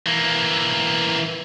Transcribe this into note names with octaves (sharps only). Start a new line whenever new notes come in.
E3 A#3